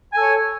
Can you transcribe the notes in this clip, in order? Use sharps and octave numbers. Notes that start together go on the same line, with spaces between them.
A4 C#5 G#5